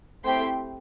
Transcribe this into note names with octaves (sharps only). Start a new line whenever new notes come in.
A3 C4 E4 G4 G5 C6